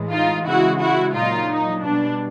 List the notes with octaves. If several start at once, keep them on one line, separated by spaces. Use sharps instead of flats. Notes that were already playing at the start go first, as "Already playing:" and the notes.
Already playing: A2 E3 G#3
D#4 F4
C#3 E3 G#3 E4 F#4
E4 F#4
A#2 F#3 D#4 F4
D#4
B2 G3 D4